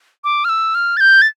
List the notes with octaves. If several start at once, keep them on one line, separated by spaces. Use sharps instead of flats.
D6
F6
E6
F6
A6
G6
A6